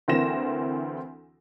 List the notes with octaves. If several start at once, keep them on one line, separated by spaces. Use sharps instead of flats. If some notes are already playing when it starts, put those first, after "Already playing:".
D2 E3 A#3 C4 A#6 E7